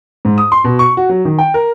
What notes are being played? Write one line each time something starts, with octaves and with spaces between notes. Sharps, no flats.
G#2
D#6
C6
B2
C#6
F#4
F#3
D#3
G5
A#4